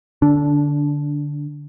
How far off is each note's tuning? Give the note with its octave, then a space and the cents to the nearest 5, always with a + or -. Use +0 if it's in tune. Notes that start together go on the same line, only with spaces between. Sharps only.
D3 +0 D4 -20